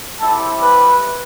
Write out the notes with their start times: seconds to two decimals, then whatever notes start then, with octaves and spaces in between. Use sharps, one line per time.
0.20 G3 C4 E4 G4 A4
0.59 B4